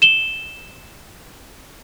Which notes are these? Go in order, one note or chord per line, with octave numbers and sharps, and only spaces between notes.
E7 G7